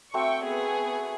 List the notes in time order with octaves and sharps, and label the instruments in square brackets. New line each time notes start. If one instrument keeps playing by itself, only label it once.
[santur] A3 C4 F#4 [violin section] G5 C#6
[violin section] B3 G#4